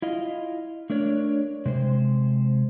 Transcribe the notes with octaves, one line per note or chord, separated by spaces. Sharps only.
E4 F4 D#5
A3 D4 A#4 C#5 D5
C3 G#3 C5